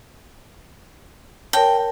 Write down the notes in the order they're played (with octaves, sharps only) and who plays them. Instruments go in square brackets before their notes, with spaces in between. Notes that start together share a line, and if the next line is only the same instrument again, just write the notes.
[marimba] A#4 C#5 A5 [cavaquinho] G5